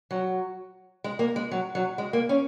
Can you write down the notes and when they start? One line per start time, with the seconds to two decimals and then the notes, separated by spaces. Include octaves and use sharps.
0.11 F#3
1.04 G#3
1.19 A#3
1.36 G#3
1.51 F#3
1.75 F#3
1.98 G#3
2.13 A#3
2.29 C#4